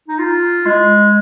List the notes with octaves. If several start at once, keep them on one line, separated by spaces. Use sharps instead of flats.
D#4
F4
G#3